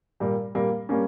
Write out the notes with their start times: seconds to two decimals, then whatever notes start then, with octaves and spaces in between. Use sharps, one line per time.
0.20 A#2 G3 A#3
0.54 A#2 G3 A#3
0.89 G3 A#3 C#4